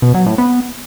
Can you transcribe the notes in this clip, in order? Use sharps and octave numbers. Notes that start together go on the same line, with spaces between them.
B2
F#3
A2
B3